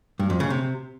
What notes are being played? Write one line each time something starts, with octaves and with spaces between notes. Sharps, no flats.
G2
F2
C#3
C3